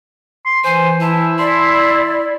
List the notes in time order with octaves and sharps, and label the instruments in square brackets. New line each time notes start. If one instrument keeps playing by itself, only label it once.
[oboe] C6
[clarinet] E3 [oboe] C5 [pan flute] G#5
[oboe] E4 [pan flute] A5
[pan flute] D5 [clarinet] C6